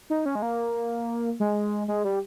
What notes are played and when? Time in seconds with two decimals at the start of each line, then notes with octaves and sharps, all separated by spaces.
0.10 D#4
0.26 C#4
0.35 G#3
0.42 A#3
1.40 G#3
1.88 G#3
2.04 G3